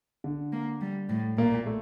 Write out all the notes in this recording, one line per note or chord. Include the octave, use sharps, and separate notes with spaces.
D3
A#3
G3
A2
A#2 A#3
A3